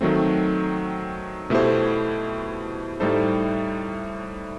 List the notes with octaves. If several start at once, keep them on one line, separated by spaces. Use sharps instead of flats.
D#3 F#3 A3 C4
B2 A3 E4 G4 C5
A2 G3 D#4 A4 C5